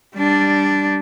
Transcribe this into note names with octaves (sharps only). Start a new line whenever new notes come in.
G3 D4